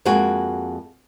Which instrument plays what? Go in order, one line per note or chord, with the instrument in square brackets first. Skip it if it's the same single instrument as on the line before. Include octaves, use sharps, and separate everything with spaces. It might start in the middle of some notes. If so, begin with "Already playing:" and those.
[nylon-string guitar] F2 G#3 A#3 F#4 G#5